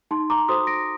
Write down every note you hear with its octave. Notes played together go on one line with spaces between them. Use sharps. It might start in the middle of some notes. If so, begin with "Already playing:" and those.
D#4 A5 C6
A#5 D6
F#4 A4 C5 C6 D#6
A#6 D7